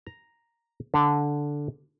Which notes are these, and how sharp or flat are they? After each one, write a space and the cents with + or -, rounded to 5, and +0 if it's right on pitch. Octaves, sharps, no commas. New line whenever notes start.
A#5 +0
D3 -5